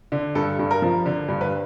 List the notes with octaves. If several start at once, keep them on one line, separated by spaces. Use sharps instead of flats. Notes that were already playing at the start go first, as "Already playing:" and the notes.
D3
G2 A4
G2
A#4
F3
D3
G2
B4